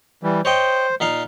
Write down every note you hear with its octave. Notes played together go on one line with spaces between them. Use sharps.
E3 G3
C5 C#5 D#5 G5
A#2 D#4 F5